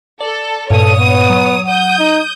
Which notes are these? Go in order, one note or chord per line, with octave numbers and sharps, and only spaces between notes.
A4 D5
G2 A#2 A4 C#5 D#6
B3
F#3
F#5 D#6 G6
D#4